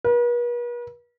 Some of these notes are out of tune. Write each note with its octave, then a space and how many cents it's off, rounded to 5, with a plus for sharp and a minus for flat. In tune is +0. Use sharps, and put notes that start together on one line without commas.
B4 -45